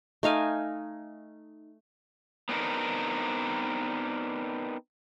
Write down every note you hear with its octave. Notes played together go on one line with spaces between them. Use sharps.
A3 D#4 F5 G#5
B3 C4 D4 D#4 A#4